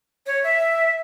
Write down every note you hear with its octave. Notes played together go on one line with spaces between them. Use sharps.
C#5
E5